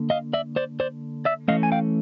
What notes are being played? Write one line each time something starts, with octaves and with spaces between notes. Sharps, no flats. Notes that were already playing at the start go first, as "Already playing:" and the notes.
Already playing: D3 A#3
D#5 F5
D5 E5
C5 D5
C5 D5
D5 E5
E3 A3 C#4 D#5 F5
G#5
F5 G5